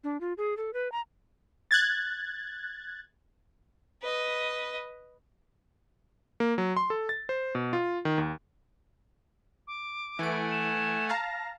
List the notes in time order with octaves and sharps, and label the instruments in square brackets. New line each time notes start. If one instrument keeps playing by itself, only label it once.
[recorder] D4
F4
G#4
A4
B4
A#5
[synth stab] F#6 G#6 A6
[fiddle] B4 D#5
[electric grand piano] A#3
F#3
C6
A4
A6
C5
B2
F4
D#3
D#2
[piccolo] D6
[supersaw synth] E3 D7 [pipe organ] A3 F#5 G#5
[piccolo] E7
[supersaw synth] F5 A5 A#5 [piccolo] A#6